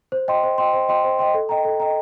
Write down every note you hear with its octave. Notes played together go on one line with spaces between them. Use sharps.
C5
D#5 G5 C6
C5
D#5 G5 C6
C5
D#5 G5 C6
C5
D#5 G5 C6
A4
D#5 G5 A#5
A4
D#5 G5 A#5